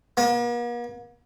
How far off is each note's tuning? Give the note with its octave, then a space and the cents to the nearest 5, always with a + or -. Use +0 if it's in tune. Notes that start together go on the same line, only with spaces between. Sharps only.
A#3 +45